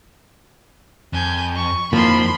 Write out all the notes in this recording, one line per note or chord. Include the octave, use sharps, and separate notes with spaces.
F2 G#5 G6
C#6
F2 D#3 F3 A#3 B5 C6